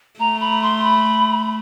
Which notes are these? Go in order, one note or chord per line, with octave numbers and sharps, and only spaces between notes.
A3 A#5
B5
C6
B5